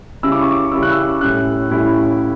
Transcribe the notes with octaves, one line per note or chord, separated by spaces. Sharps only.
C#3 G3 C#4 E4 E6
D6
C#6
D6
C#3 G3 C#4 E4 E6
F#6
E6
A2 G3 C#4 E4 F#6
A2 G3 C#4 E4